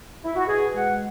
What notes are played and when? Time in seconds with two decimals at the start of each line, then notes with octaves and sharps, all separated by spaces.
0.24 E4
0.36 F#4
0.47 B2 G#4
0.75 G#3 F#5